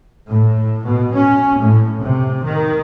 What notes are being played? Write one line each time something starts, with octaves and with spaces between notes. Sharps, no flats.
A2
B2
C#4
A2
C3
D#3